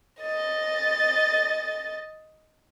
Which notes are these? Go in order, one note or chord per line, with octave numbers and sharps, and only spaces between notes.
D#5 A6